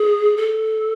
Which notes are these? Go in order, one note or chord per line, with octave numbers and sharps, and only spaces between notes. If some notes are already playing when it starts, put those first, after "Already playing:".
Already playing: G#4
A4